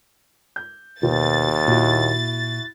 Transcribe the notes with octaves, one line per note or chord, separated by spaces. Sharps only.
G6
D#2 B2 A6
A#2 E4 F#4